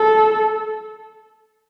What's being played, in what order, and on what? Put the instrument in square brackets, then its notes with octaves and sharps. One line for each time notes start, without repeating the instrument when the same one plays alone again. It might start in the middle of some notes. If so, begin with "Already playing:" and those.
Already playing: [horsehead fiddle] A4